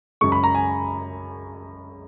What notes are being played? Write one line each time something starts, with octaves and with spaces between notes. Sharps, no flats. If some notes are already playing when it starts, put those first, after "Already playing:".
F#2 C#3 G#3 C#6
B5
A#5
G#5